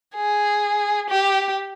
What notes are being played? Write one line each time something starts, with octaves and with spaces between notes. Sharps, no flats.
G#4
G4